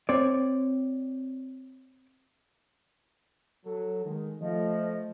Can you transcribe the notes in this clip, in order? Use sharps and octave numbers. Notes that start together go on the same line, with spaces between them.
C4 C#5 D5
F#3 A4
D#3 G#3
F3 A3 D#5